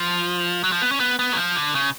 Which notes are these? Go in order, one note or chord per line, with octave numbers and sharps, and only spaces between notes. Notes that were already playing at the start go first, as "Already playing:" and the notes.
Already playing: F3
F#3
F3
B3
C#4
B3
B3
F#3
F3
D3
C#3